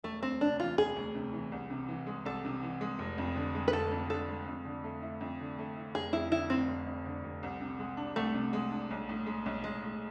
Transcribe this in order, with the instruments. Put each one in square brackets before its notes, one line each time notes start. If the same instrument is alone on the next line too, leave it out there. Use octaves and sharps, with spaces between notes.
[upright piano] E1 [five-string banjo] A3
[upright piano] D2 [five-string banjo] C4
[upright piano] C3 [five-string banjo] D4
[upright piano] E3 [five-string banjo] F4
[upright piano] E1 [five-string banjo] G#4
[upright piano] D2
C3
E3
C2
C3
E3
G#3
[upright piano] C2 [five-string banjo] A4
[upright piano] C3
E3
G#3
F1
F2
D3
G#3
[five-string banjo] B4
[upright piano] F1 [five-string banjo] A4
[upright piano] F2
[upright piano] D3 [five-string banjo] A4
[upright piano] G#3
F2
D3
A3
E4
F2
D3
A3
E4
[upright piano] F1 [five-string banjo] G#4
[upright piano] F2 [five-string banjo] E4
[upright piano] D3 [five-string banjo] E4
[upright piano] F1 [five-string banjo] C4
[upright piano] F1
F2
D3
F1
C2
C3
G#3
D4
[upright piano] C2 [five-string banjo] A3
[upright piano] C3
G#3
D4
B1
A2
G#3
B1
[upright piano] B1 [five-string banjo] G#3
[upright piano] A2